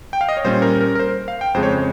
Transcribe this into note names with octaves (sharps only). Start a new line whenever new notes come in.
G5
F5
D#5
C#5
A#2 G3 C#4 C5
A#4
A#4
A#4
C5
F5
G5
F2 C#3 G#3 C5
C#5
C5